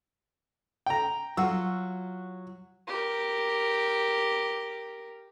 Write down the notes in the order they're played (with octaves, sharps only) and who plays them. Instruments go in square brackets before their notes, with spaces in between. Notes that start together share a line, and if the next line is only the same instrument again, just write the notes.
[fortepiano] G5 A#5
[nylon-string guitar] F#3 F4 [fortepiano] F#4 E6
[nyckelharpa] G4 A#4